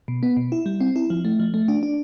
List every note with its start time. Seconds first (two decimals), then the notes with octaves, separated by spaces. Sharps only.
0.08 B2
0.23 B3
0.37 B2
0.52 E4
0.66 G3
0.81 C4
0.96 E4
1.10 F3
1.25 A3
1.40 F3
1.54 A3
1.68 D4
1.83 D4